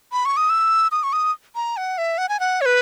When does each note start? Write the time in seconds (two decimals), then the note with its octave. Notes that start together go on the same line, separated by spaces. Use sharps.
0.12 B5
0.25 C#6
0.37 D#6
0.50 E6
0.92 D#6
1.03 C#6
1.13 D#6
1.55 A#5
1.77 F#5
1.98 E5
2.18 F#5
2.29 G#5
2.40 F#5
2.61 C#5
2.66 B4